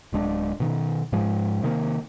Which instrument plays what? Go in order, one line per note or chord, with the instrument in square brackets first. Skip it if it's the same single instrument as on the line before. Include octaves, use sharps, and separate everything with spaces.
[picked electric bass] D1 G#3 D4
B2 D#3
G#2 F3 G#3
C3 D#3 G#3 A#3